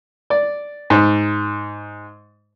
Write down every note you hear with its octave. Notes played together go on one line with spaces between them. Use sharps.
D5
G#2